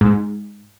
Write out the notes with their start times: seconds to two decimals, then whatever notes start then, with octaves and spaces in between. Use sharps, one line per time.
0.01 G#2